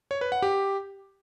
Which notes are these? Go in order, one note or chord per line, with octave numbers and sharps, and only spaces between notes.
C#5
B4
F#5
G4